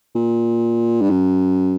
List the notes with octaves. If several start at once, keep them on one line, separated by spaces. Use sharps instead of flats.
A#2
G2
F#2